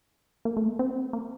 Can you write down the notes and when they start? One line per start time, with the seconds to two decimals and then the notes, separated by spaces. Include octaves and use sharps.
0.45 A#3
0.57 A3
0.68 A#3
0.79 C4
1.13 A#3